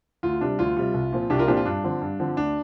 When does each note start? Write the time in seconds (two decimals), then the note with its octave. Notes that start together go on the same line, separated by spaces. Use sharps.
0.23 D2 F4
0.41 C3 G3 D4
0.59 D2 F4
0.77 C3 G3
0.94 C2
1.12 A#2 F3 C4
1.30 C2 D4 G4
1.39 F4 A#4
1.48 A#2 F3 C4 D4 G4
1.57 F4
1.65 G2 D4
1.84 D3 F3 C4
2.02 G2
2.20 D3 F3 C4
2.37 D2 D4